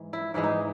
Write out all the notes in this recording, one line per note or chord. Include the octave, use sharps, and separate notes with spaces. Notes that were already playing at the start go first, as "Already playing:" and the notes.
Already playing: G#2 E3 G#3
E4
G#2 E3 G#3 E4
D#4